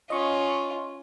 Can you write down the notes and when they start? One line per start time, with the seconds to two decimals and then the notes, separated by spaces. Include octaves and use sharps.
0.10 C#4 F4 D#5 C#6